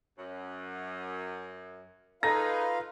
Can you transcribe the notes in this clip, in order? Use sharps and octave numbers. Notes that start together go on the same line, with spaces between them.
F#2
G#3 D#4 F4 A4 B4 F5 A#5 A#6